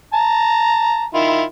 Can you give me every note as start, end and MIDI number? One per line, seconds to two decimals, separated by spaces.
0.14 1.04 81
0.14 1.04 82
1.14 1.43 51
1.14 1.43 64
1.14 1.43 65